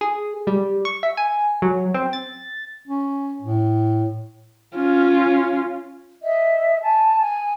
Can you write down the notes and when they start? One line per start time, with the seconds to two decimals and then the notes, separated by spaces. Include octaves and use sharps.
0.01 G#4
0.47 G3
0.85 C#6
1.03 E5
1.17 G#5
1.62 F#3
1.94 C4
2.13 A6
2.87 C#4
3.42 A2
4.76 C#4 F4
6.22 D#5 E5
6.82 G#5 A5
7.20 G#5